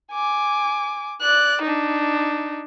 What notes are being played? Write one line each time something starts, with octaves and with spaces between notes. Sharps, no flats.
G#5 D6
D5 F#6
D4 D#4